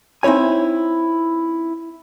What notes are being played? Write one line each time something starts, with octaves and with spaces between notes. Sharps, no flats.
C4 D#4 E4 C#5 G#5